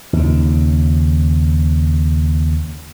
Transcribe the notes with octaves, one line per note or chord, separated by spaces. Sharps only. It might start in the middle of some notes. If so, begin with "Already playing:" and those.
D#2 C#3